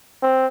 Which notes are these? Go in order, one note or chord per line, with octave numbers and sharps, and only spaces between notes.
C4